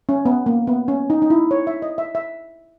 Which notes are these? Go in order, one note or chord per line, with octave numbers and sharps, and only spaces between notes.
C#4
B3
A#3
B3
C#4
D#4
D#4
E4
C#5
E5
D#5
E5
E5